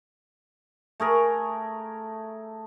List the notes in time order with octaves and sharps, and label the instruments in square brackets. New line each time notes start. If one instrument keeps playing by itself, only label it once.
[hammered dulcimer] A3 G#4 A#4